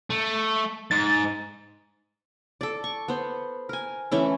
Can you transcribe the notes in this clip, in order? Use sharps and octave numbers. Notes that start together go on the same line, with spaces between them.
A3
G#2 A6
A4 D5
C#6
B3 C5
A#4 G#5
E3 A3 C#4 E4